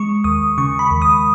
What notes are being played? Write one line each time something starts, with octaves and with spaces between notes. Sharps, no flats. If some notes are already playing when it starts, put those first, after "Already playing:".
Already playing: G#3 C#6
D#2 D#6
C#3 C#6
B5
D#2
D#6